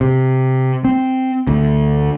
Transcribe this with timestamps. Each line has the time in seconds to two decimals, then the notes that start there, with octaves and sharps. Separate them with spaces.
0.01 C3
0.84 C4
1.47 D2